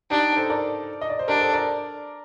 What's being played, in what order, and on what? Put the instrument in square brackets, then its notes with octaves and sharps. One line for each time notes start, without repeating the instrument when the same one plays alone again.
[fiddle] D4 [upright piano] D#4 G4
[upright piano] A4 C5
A#4 D5
D#5
D5
C5
[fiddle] D4 [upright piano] G4 A#4
[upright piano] A4 C5
A#4 D5